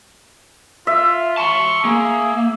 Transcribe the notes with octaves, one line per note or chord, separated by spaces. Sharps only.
F4 E5
A5 C6 C#6
A#3 G#4